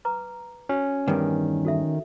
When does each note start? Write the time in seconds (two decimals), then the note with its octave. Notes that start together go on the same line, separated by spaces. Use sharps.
0.05 B4 A#5 D6
0.69 C#4 F#4
1.08 E2 G2 D#3 B4 G#5
1.65 F#4 A4 E5